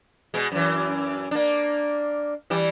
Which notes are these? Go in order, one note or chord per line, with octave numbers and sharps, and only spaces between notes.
B2 G#3
F#2 E3
A#3 D4
E3 G3